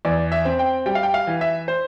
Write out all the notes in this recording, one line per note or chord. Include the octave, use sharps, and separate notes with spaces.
E2 D5
E5
C4
G5
G3 G5
F5
G5
F5
E3
E5
C5